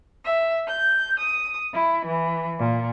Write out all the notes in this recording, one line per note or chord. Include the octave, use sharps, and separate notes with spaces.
E5
G6
D#6
E4
E3
A#2